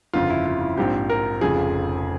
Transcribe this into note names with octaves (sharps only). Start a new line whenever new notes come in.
G1 F2 C#3 F4
E4
F4
E4
A#1 G#2 F3 C4 G4
A#4
F1 F2 C#3 F3 G#4